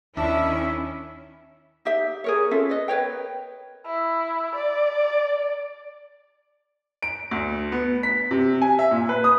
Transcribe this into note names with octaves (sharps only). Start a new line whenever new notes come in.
D#2 D#3 C#4 D4 E4 E5
D#4 G4 E5
G#4 A#4 C#5
C#4 F4 A4 E5
B4 D#5
A#4 B4 C#5 G5
E4
D5
D7
D2
B3
B6
C3
G#5
E5
A#2
B4
D#6